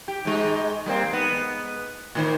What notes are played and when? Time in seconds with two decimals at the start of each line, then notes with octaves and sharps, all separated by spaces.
0.08 G4
0.25 G#2 G#3
0.86 G3 A#3 C4
1.12 G#2 B3
2.15 A2 D#3 C5